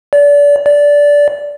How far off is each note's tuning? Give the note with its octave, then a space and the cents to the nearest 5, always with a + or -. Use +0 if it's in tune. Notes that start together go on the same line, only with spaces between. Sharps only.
D5 -30
D5 -15